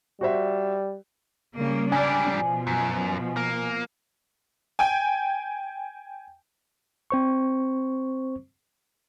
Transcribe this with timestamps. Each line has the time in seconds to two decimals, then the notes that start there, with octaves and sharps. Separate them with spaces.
0.21 G3 F#4 C5 E5
1.57 C#3 G3 A#3
1.92 G#2 G3 D4 D5 G#5
2.35 B2 F3
2.67 F#2
3.37 A#3
4.79 G5 G#5
7.10 C4 C5 C#6